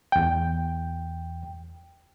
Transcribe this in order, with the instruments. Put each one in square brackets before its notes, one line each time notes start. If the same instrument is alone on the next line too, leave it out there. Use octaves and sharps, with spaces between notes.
[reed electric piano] E2 G5